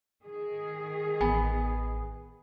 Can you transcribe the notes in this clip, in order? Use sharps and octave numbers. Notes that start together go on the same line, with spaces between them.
D#3 G#4
A1 B3 G#5